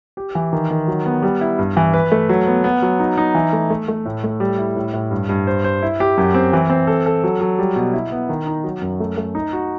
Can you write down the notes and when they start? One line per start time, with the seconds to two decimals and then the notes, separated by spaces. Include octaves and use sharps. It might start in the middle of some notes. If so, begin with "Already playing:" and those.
0.17 G4
0.35 E3
0.53 D#3
0.71 D#3
0.88 F#3
1.06 B3
1.22 G3
1.41 E4
1.59 G2
1.77 E3
1.93 B4
2.12 A3
2.29 F#3
2.47 B3
2.64 B3
2.82 F#3
3.00 D#4
3.18 D#4
3.35 E3
3.53 A3
3.70 A3
3.88 A3
4.05 A2
4.24 A3
4.40 G3
4.58 E4
4.76 A2
4.93 A2
5.11 G2
5.29 G2
5.47 C5
5.64 C5
5.83 E4
6.00 G4
6.18 F#2
6.34 C4
6.53 E3
6.70 C4
6.87 A4
7.06 A4
7.24 F#3
7.41 F#3
7.59 G3
7.76 B2
7.93 E4
8.12 B3
8.29 D#3
8.47 D#4
8.64 F#3
8.82 F#2
9.00 A3
9.17 A3
9.35 D#4
9.53 F#4